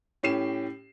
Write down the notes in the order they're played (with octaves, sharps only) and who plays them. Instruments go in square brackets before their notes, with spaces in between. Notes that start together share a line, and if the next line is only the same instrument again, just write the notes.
[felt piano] A2 C#4 G4 C7 E7